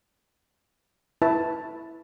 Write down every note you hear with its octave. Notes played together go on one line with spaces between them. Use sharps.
E4 B4 A5